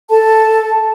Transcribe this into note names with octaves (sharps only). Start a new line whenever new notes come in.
A4 A5